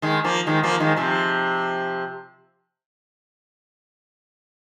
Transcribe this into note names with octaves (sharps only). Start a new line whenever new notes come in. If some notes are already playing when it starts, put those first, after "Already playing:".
D#3 G#3
F3 A#3
D#3 G#3
F3 A#3
D#3 G#3
C3 F3